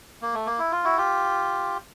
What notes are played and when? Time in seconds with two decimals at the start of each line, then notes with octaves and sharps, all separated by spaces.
0.22 A#3
0.34 A3
0.46 A#3
0.59 E4
0.72 F4
0.84 E4 F#4
0.97 F4 G4